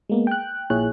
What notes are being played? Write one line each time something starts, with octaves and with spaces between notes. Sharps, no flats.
G#3 A#3 B3
G5 F#6
A#1 A#2 E4 G#4 C#5 F#6